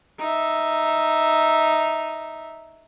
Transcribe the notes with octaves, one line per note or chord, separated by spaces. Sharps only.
D#4 E5